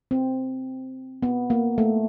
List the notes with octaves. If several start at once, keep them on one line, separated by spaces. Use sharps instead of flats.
C4
B3
A#3
A3